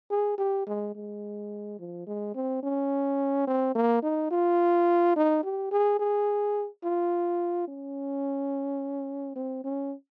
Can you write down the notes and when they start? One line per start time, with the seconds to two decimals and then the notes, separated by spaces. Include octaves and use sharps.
0.11 G#4
0.38 G4
0.67 G#3
0.95 G#3
1.79 F3
2.07 G#3
2.35 C4
2.63 C#4
3.47 C4
3.75 A#3
4.03 D#4
4.31 F4
5.16 D#4
5.43 G4
5.71 G#4
5.99 G#4
6.84 F4
7.68 C#4
9.36 C4
9.64 C#4